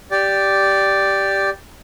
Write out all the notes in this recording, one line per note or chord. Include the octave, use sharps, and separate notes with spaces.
G4 D5